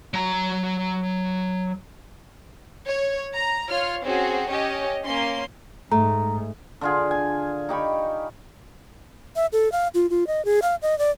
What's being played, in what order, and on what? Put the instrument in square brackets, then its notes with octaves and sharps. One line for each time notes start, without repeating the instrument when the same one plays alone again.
[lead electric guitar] F#3 A#5
[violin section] C#5
A#5
F4 C#5 F6
C4 C#4 F#4 G#4
C#4 G4 C#5 D#5
A#3 C#4 C6
[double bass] G#2 [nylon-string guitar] A3 [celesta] A#5
[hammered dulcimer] D3 F4 G#4
G#5
D#4 G4 B5 C#6
[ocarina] E5
A4
F5
F4
F4
D#5
G#4
F5
D#5
D5